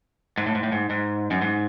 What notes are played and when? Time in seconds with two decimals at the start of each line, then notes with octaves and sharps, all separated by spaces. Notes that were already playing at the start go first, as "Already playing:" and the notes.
0.38 G#2
0.47 A2
0.55 G#2
0.63 A2
0.72 G#2
0.90 G#2
1.31 F#2
1.42 G#2